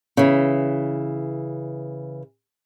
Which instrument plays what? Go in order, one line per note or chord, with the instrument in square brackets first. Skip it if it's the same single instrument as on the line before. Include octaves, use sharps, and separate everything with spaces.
[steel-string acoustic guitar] C#3 E3